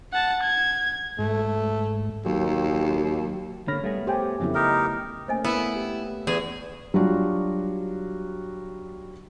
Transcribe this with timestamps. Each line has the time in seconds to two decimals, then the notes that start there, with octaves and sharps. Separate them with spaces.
0.12 F#5 A5
0.43 G#6
1.19 G#2 A3
2.26 D#2 F#3
3.68 D3 A#3 C#5 B5 F6 A#6
3.84 G3 A3 B3 G#4
4.07 G4 C5 G5 G#5
4.40 F2 C#3 F#3 A3 B3 E4
4.55 D#4 G4 A#4 D#5
5.28 A3 A#3 C#4 C5 D#5 G#5
5.44 B3 E4
5.75 G4
6.27 E2 G#4
6.94 F#3 G3 D4 F4 F#4